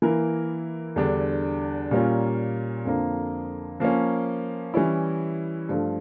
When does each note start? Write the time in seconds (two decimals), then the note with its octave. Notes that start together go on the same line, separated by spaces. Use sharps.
0.02 E3 A#3 E4 A#4
0.96 E2 D3 G3 D4
1.91 A#2 G3 A#3 C#4 F4
2.85 F2 D3 F3 A#3
3.80 F3 A#3 C#4
4.74 E3 G3 C#4 E4
5.69 G2 F3 A3